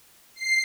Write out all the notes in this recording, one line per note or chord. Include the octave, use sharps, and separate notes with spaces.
C7